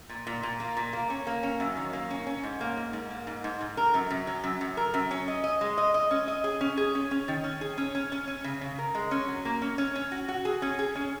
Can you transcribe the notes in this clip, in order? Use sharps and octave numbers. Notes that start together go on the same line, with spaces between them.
A#2
A#2
A#2
A#3
A#2
A#3
C#4
A#3
C#4
F#2
D#3
A#3
C#4
C#4
G#2
A#3
G#2
G#2
A#3
G#2
G#2
G#2
A#4
F#2
F#2
F#3
F#2
F#2
A#4
F#2
C#4
D#5
D#5
G#3
D#5
D#5
C#4
D#5
G#4
C#4
G#4
C#4
C#4
D#3
C#4
G#4
C#4
C#4
C#4
C#4
C#3
C#3
A#4
G#3
C#4
F#3
A#3
C#4
C#4
C#4
F#4
F#4
G#4
C#4
G#4
C#4